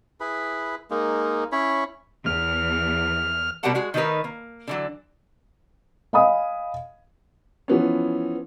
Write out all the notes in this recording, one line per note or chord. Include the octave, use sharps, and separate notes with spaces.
E4 G#4 B4 B5
G#3 A#3 D#4
C#4 E4 C#5 B5
E2 E3 F6
B2 G3 G4 A#4 F#5 A5
G#3 F#4 G#4
D#3 A3 D#4 F#4 A#4 B4
A#3
D3 E3 F#3
D#5 F5 G#5 B5 D#6
E3 F3 B3 C#4